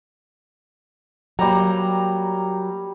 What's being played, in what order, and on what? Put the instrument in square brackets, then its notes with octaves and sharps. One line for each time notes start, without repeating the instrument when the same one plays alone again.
[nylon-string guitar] F#3 A#3 [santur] G3 A#5